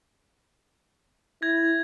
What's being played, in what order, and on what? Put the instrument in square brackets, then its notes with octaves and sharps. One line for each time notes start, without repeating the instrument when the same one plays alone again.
[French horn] E4 [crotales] G#6 A#6